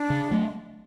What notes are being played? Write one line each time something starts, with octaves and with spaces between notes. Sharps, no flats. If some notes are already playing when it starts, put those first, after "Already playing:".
Already playing: D4
C#3
F#3 A3